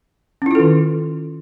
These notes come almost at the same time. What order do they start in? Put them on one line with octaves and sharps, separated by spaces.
C#4 E4 F4 A4 D#3